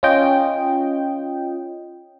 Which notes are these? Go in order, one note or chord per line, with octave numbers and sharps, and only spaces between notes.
C#4 F4 D#5 G5